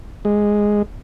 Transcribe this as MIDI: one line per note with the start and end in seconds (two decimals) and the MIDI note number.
0.25 0.82 56